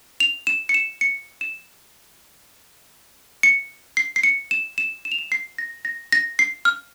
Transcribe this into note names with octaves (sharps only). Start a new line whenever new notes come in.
F7
E7
C#7
E7
C#7
E7
C#7
C7
C7
C#7
E7
E7
E7
F7
E7
C7
A#6
A#6
A#6
C7
F6